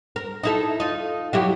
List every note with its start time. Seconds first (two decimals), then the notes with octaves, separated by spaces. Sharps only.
0.16 A#4
0.43 D#4 E4 A4
0.80 D#4 F4
1.33 F#3 E4 G4